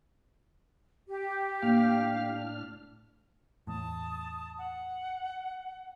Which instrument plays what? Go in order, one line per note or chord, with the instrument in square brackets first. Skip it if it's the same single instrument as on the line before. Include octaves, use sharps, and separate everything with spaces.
[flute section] G4
[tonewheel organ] A2 D4 F6 [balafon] A#3 [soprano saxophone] F5
[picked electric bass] E2 A2 [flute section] A5 D#6
[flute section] F#5